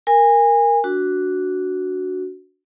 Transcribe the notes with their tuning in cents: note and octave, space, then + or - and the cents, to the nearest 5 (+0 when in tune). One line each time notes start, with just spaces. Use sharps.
A#4 +0 G#5 -25
D4 -15 F#4 +0